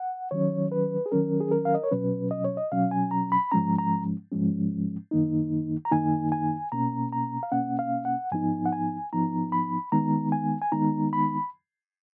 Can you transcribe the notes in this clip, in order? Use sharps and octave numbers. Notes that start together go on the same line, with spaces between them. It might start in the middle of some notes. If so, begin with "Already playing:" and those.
Already playing: F#5
D#3 F#3 C#4 C#5
B4
G#4
D#3 F#3 C#4 A#4
G#4
A#4
F5
D#5
C#5
B2 F#3 C#4 B4
D#5
C#5
D#5
B2 F#3 C#4 F5
G#5
A#5
B5
G#2 F3 G#3 C#4 A#5
A#5
G#2 F3 G#3 C#4
F#2 D#3 A#3 D#4
A#5
F#2 D#3 A#3 D#4 G#5
G#5
B2 A#3 C#4 A#5
A#5
F5
B2 A#3 C#4 F#5
F5
F#5
G#2 F3 B3 D#4 G#5
F#5
G#5
G#2 F3 B3 D#4 A#5
B5
D#3 G#3 B3 D#4 A#5
G#5
G#5
D#3 G#3 B3 D#4 A#5
B5